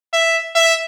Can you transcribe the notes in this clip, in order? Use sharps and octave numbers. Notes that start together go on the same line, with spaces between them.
E5
E5